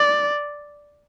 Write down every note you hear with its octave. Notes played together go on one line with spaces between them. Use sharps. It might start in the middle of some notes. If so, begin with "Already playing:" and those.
Already playing: D5